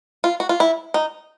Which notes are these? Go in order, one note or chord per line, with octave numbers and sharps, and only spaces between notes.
F4
F#4
F4
E4
D#4